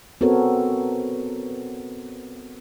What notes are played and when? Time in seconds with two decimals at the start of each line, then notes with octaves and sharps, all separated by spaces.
0.21 B3 C4 F#4 A4 A#4 C#5